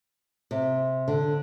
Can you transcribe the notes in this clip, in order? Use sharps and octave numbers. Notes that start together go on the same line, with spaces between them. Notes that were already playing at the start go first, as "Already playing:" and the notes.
C3
D3